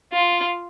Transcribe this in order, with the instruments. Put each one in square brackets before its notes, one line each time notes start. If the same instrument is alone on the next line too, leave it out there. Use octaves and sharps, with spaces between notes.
[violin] F4